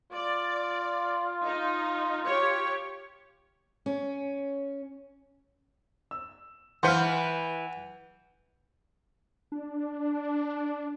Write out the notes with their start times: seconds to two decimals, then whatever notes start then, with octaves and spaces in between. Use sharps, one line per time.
0.12 F4 D5
1.43 D#4
2.25 G4 C#5
3.86 C#4
6.11 E6
6.83 E3 B4 C5 F5 F#5 G6 C#7
9.52 D4